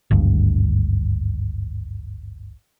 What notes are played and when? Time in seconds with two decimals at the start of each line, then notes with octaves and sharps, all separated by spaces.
0.11 G#1 D2 G2